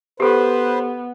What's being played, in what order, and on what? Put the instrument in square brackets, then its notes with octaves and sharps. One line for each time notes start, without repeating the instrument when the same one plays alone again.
[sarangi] B3 [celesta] G4 A4 [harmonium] B4 C5